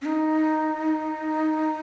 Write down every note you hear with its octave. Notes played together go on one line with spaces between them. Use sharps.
C#4
D#4